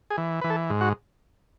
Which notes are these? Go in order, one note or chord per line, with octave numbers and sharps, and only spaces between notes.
G#4
E3
E3 B4
A4
G#2
F#4